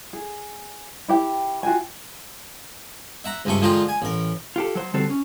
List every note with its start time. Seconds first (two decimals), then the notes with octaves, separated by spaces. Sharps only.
0.13 G#4
1.08 E4 G4 G5
1.63 F4 F#4 G5 G#5
3.24 E5 F#5 A#5
3.45 C#2 G2 C3 A3 C#6
3.61 D3 F3 G#3 F4 G4 A#5
3.88 G#5
4.02 A1 A#4
4.56 F4 G4 A4
4.75 F#3 C5
4.94 D3 G3 C4 F#4 A4 C5
5.10 C#4